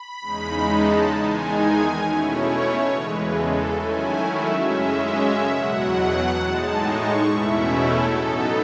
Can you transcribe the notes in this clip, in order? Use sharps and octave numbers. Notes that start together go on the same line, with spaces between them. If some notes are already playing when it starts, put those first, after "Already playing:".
Already playing: B5
E2 C#3 G#3 D#4
A5
E2 D#3 G#3 D#4 G#5
B2 A3 C#4 E4 C#5
E2 C#3 E3 G#3 B4
A4
D#3 F#3 A3 C#4 E4 G#5
E5
F#2 C#3 G#3 C#4 E5
E2 B2 F#3 F#5
A2 G#3 D#4 A5
C#6
E2 B2 A3 C#4 E4 E5
A4
A2 F#3 B3 D#4